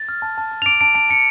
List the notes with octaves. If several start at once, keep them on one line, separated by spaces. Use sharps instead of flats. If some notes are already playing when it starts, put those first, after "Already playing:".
Already playing: A6
F6
A5
A5
A5
F7
D6 D7
A5 D7
A5 D7
A5 C#7